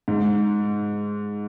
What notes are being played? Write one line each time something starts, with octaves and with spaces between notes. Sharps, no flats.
G#2